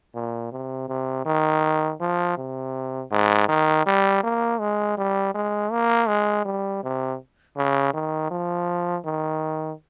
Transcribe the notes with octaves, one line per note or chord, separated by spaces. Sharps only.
A#2
C3
C3
D#3
F3
C3
G#2
D#3
G3
A#3
G#3
G3
G#3
A#3
G#3
G3
C3
C#3
D#3
F3
D#3